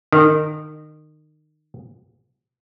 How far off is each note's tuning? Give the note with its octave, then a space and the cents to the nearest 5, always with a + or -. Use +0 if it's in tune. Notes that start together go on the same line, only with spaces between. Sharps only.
D#3 -25